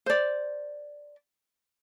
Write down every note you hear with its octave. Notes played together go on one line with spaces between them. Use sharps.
C5 D5